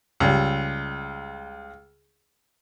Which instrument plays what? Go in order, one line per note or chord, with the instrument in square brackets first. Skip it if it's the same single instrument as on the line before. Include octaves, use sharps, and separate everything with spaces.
[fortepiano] C#2 G3